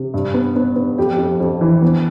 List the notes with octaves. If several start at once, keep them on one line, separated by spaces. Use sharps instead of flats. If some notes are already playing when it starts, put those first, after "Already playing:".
Already playing: C3
G2
B3
B3
B3
F2 G4
F2
F2
E3
B3